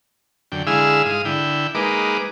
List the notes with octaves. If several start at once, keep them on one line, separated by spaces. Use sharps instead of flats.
F#2 D3 G5
D3 G#3 E4 G#4 F5 E6
G#2 F5 D#6
D3 E4 G5
G#3 A#3 D#4 B4 D6